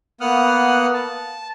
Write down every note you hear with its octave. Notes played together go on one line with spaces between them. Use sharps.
A#3 B3 F#5 D#6 F6 F#6
A5